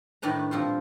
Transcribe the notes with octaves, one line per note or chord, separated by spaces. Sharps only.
A2 D#3 D4 B4 A#5
G2 A#2 F3 C4 F4